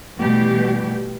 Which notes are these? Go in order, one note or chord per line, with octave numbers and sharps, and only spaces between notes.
B2 E3 G3 A3 G4